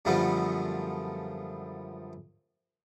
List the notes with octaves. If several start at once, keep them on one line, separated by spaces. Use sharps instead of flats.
F#2 D3 F3 G3 A3 B3